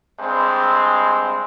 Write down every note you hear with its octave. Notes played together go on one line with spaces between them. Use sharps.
G2 G#3 C4